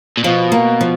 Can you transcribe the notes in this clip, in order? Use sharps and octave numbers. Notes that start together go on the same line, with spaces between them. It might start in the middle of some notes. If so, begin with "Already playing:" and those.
A#2
B2 F3
A#3
F3